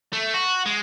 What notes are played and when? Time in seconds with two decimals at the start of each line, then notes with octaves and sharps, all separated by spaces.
0.13 A3
0.34 F#4
0.66 G#3